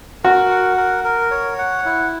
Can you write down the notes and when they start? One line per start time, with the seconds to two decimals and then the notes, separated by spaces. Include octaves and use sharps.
0.24 F#4 A#4
0.50 F#5
0.77 A#4
1.04 A#4
1.31 C#5
1.59 F#5
1.85 E4